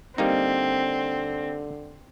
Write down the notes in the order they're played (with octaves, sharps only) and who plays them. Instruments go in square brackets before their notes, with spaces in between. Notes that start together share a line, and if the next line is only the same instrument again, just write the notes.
[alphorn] D3 [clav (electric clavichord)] G3 A#3 D#4 [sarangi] C4